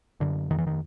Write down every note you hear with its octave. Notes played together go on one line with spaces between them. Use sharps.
F#2 D3
F2 D#3
E3
D#3